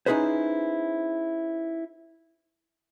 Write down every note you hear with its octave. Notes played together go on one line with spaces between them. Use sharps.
C#4 D#4 E4 G#4 B4 C5